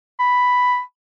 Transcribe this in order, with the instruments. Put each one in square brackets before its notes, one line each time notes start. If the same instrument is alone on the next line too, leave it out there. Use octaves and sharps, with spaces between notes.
[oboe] B5